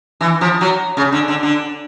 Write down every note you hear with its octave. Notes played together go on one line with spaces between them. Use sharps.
E3
F3
F#3
C#3
D3
D3
D3